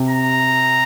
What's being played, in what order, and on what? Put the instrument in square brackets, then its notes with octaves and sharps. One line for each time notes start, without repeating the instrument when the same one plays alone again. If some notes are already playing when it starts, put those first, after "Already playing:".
Already playing: [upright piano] C3
[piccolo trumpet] A#5